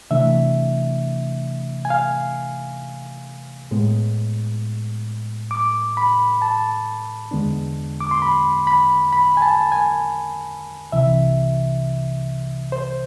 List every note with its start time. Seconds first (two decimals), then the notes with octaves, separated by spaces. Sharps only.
0.11 C3 E3 A3 D4 E5
1.85 G#5
1.90 F5
3.71 A2 G#3 B3
5.51 D6
5.97 B5
6.42 A5
7.31 E2 D3 G#3 B3 D4
8.00 D6
8.11 C6
8.22 B5
8.67 B5
9.13 B5
9.37 G#5
9.42 A5
9.72 G#5
10.92 C2 C3 E3 E5
12.72 C5